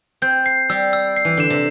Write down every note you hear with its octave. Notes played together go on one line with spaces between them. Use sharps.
C4 G6
C7
G3 E6
E6
C7
E3
D3 E7
C3